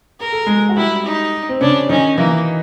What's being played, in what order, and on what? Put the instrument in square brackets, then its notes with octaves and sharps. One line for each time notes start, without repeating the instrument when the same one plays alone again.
[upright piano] G#4 [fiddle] A#4
[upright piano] A4
G#3 G#4
F#4
[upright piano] G3 G4 [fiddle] E4
[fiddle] D#4
[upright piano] C4
[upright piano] C#3 C#4 [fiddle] D4
[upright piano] D#3 D#4 [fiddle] C#4
[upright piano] E3 E4 [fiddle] A#3